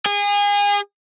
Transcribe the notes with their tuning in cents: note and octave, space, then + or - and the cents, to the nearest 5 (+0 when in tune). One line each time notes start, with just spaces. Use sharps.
G#4 -30